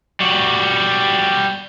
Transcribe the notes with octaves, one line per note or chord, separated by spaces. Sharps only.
G3 F#4